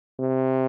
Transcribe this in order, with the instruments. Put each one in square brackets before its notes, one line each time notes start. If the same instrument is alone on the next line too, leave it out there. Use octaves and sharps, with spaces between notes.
[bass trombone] C3